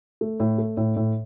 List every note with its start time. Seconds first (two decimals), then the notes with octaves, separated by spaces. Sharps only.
0.21 A3
0.40 A2
0.58 A3
0.77 A2
0.96 A2